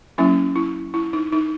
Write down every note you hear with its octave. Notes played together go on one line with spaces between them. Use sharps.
F#3 A#3 C#4 E4
E4
E4
D#4
D#4